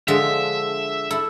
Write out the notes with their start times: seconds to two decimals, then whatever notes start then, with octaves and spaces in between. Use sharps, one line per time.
0.08 D3 F3 G#3 E5
1.10 E4 A4